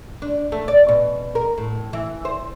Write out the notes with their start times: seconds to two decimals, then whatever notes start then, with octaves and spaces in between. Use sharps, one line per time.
0.22 D4
0.52 A3
0.68 D5
0.89 B2
1.35 A#4
1.58 A2
1.93 E3
2.25 C5